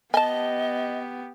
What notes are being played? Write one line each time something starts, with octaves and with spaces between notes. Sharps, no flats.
B3 G4 D#5 G#5 A5